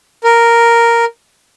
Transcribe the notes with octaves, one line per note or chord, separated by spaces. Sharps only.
A#4